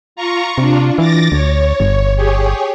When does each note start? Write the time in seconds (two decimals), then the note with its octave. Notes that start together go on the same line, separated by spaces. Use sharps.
0.16 F4 A#5 C#6
0.58 C3 D4 F4
0.98 E3 D6 A6 A#6
1.32 D2 C#5
1.80 G1
2.16 G4 G#4 C#5